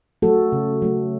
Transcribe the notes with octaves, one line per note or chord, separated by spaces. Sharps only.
F#3 A3 F#4 A4
C#3
F#3 A3